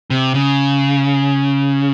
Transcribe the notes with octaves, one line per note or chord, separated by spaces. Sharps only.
C3
C#3